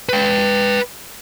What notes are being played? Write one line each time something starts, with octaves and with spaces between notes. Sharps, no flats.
B4 G5